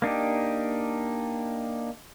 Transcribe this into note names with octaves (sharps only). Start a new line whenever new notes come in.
A#3 D4 D#4 G4